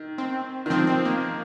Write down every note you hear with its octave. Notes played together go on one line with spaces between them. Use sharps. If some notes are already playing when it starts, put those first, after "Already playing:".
Already playing: D#3
C4
D#3
F3 C4
C4
A#3